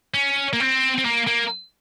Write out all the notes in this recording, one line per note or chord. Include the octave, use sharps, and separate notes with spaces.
C#4
A#3
C4
C4
A#3
A#3